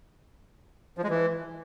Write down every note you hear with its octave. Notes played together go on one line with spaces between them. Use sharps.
F3
G#3
E3